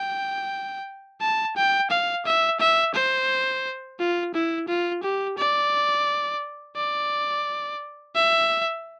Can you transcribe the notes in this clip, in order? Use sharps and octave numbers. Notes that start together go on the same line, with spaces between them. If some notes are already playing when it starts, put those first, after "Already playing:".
Already playing: G5
A5
G5
F5
E5
E5
C5
F4
E4
F4
G4
D5
D5
E5